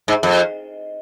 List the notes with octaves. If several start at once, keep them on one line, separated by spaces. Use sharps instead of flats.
G#2
F2